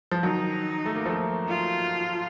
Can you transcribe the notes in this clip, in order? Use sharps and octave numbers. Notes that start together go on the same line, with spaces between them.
F3
D#3 F#3 D#4
A3
A#3
F3 A3
F4